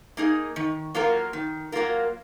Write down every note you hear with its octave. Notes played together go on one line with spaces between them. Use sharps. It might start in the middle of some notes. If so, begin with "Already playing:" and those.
A#3 D#4 G#4
D#3
F#3 A#3 F4 A#4
D#3
F#3 A#3 F4 A#4